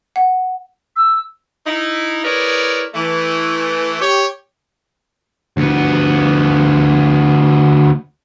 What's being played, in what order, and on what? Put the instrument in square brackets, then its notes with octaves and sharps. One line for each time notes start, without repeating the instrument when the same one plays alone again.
[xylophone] F#5
[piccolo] E6
[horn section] D#4 E4
E4 G#4 A#4 B4 C#5 D5
E3 A3
G4 C#5
[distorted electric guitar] D2 B3